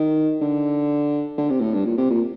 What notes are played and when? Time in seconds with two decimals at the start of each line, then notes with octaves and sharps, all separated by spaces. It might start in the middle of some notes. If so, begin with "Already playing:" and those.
Already playing: D#3
0.41 D3
1.38 D3
1.50 C3
1.61 A2
1.74 G2
1.85 A#2
1.98 C3
2.10 A#2